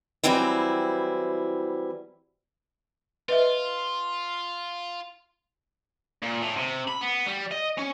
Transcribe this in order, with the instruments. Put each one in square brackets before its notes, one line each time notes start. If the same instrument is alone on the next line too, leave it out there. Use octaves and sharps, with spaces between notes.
[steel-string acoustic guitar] E3 F#3 G3 C4 E4
[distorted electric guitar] F4 [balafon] B4 D#5 E5
[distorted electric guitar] A#2
A2
C3
B5
B3
G3
D#5
C#4